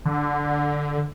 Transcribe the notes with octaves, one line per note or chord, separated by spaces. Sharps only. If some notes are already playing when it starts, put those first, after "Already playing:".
D3